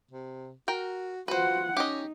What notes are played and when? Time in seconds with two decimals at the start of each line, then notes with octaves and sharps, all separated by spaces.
0.11 C3
0.68 F#4 A#4 G5
1.28 F4 F#4 B4 C5 F#5
1.77 C#4 D#4 G4 D#5